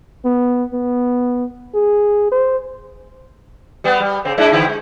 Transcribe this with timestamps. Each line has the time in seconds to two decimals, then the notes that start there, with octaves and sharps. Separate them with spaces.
0.25 B3
0.73 B3
1.75 G#4
2.32 C5
3.84 G3 B3
4.00 G3
4.25 C#3 C4
4.38 G#3 D4 E4
4.52 D3 C4 E4
4.67 G#3